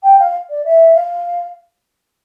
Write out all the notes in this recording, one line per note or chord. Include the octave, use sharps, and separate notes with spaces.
G5
F5
D5
E5
F5